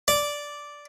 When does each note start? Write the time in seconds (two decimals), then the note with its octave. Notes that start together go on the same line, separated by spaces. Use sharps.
0.08 D5